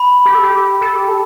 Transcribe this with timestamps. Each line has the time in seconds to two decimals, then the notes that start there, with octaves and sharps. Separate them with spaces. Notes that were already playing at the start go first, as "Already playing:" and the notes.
Already playing: B5
0.26 G4
0.35 A4
0.43 G4
0.81 A4
0.95 G4
1.08 A4